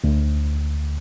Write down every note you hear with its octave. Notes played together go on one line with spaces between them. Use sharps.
D2